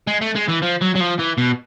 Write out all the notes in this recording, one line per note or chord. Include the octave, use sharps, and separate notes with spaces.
G#3
A3
G#3
E3
F3
F#3
F#3
F3
E3
B2